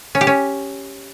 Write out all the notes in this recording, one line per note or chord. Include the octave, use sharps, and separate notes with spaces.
C#4
G4
C#4